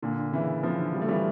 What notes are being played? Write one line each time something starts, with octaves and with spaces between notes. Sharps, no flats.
A#2 D3
C#3 E3
D3 F3
G3
A3
E3 G3